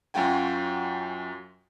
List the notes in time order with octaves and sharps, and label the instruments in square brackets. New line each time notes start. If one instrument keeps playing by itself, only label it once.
[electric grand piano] F#2 F#3 F4 F#4 G5 G#5